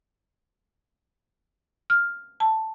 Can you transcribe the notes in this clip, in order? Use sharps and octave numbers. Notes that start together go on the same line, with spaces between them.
F6
A5